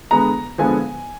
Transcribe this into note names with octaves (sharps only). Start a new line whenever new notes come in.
D3 G#3 B3 A#5
D3 F3 G#3 B3 G#5